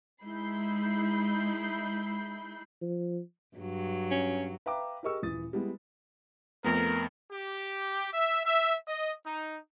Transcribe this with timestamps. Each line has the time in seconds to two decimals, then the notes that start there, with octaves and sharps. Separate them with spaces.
0.24 G#3 D#4 E4 B5 G6 C7
2.82 F3
3.57 G2 F#3
4.11 C#4
4.66 B4 E5 F5 G5 A#5 D6
5.03 G4 G#4 A#4 D#5 C#6 E6
5.22 D#1 E3 D#6 A6
5.53 G3 G#3 B3 E4
6.64 F2 A3 B3 A#4
7.32 G4
8.13 E5
8.46 E5
8.88 D#5
9.26 D#4